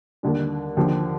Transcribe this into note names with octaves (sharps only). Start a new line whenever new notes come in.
D#2 D3 G3
D#2 D3 F3 G4